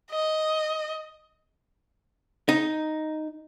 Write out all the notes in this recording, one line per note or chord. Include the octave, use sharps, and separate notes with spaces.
D#5
D#4